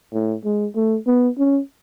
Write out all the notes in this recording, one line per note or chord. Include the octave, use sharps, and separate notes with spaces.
A2
G#3
A3
B3
C#4